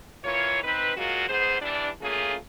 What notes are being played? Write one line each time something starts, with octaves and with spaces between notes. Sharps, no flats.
E3 A#3 F4 C#5
C4 D#4 B4
F#3 G#3 A#3 F4 F#4
G#2 B3 G#4 C5
E3 G3 D4
A3 A#3 C#4 F4 G#4